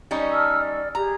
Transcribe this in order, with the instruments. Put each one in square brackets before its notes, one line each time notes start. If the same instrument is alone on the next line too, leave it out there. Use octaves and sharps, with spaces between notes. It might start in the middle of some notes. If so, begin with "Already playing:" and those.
[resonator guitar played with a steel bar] G3 C#4 D#4
[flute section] A5 E6 F6
D5
[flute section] G4 G#4 [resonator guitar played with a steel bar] A#5